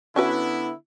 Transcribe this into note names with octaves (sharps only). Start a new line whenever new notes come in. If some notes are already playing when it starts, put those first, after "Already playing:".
D3 B3 C#4 E4 F#4 B4